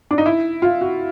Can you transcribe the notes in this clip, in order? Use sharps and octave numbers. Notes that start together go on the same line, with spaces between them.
D4
D#4
E4
F4
F#4